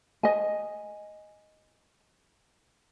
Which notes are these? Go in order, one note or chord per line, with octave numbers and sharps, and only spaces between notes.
D#5 G#5